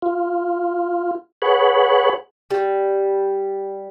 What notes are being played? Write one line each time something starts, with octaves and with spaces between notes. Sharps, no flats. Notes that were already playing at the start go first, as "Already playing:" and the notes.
F4
G#4 B4 C#5 F#5
G3